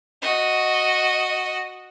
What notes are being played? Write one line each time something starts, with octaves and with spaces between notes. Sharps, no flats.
F#4 D#5